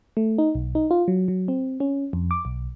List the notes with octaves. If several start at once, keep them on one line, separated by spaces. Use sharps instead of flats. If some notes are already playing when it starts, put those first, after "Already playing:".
A3
D#4
B1
D#4
F4
F#3
F#3
C4
C#4
F2
D6
B1